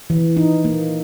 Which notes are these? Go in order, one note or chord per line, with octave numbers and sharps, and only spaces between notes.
E3
D#4
A#3